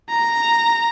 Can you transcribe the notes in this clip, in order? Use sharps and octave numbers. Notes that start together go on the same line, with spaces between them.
A#5